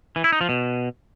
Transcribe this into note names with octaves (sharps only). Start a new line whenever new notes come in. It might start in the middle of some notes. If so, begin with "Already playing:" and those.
E3
E4
D#4
F3
B2